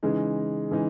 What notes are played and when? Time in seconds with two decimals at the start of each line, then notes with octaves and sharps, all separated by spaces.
0.03 C#3 E3 G#3 D#4
0.71 C#3 E3 G#3 D#4